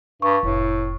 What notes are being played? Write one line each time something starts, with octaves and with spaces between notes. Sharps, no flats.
G2 C#6
F1 A2